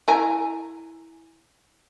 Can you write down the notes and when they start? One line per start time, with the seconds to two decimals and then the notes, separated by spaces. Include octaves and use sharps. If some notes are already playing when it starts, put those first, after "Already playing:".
0.08 E4 G#5 A#5